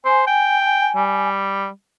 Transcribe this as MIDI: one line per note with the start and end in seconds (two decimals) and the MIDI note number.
0.05 0.23 72
0.05 1.27 80
0.27 0.90 79
0.96 1.68 55